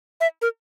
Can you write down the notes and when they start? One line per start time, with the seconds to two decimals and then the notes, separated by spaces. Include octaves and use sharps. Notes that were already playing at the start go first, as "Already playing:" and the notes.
0.21 E5
0.42 A#4